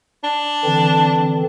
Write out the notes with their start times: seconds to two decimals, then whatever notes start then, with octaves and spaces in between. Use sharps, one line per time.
0.24 D4
0.65 D3 E3 C4